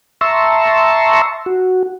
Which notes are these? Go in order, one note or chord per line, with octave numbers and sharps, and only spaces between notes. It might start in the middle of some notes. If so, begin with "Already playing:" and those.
E5 A5 A#5 C6 C#6 E6
F#4